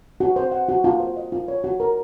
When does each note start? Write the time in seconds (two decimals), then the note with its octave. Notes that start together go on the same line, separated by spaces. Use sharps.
0.20 F#4
0.36 C5
0.52 F#5
0.69 F#4
0.84 F4
1.00 C5
1.16 D#5
1.32 F4
1.48 C#5
1.64 F#4
1.80 A#4